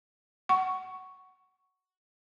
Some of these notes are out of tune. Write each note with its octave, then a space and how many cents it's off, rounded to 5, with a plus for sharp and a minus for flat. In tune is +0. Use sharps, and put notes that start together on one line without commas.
F#5 +15 C#6 +0